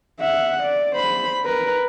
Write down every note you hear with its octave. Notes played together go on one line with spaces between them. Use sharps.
E5 F#5
D5
C5 B5
A#4 B4